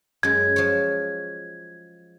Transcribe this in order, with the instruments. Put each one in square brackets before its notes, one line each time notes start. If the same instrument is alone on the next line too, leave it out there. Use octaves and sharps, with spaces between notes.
[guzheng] F#2 G#3 [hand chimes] G#6
[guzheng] F3 C#5